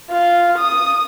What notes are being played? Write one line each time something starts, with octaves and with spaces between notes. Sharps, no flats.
F4
D#6